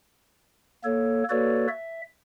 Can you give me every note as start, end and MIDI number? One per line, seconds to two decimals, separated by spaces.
0.84 1.23 58
0.84 1.23 69
0.84 1.23 73
1.30 1.67 58
1.30 1.67 66
1.30 1.67 69
1.30 1.67 71
1.30 1.67 73
1.30 1.67 74
1.68 2.01 76